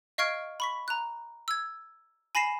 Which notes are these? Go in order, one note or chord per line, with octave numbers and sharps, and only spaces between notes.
D#5 F5 C#6 F6 G#6 D7
B5 C#6 B6
A#5 F#6
E6 G#6
G#5 B5 A#6 C7 E7